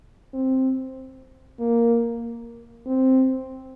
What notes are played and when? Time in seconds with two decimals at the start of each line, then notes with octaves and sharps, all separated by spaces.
0.34 C4
1.59 A#3
2.86 C4